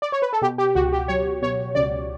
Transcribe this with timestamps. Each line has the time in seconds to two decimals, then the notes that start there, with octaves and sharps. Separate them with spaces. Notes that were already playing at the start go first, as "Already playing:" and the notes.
0.02 D5
0.12 C#5
0.22 B4
0.33 A4
0.42 B2 G4
0.58 G4
0.75 C#2 F#4
0.92 G4
1.08 F#3 C#5
1.42 B2 C#5
1.75 C#2 D5